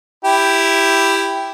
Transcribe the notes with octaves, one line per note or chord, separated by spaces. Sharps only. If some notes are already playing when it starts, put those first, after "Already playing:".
E4 G4